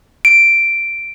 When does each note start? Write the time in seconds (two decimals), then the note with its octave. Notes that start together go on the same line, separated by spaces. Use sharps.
0.25 D7